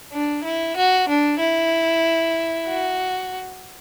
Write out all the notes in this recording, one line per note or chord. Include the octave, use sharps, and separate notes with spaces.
D4
E4
F#4
D4
E4
F#4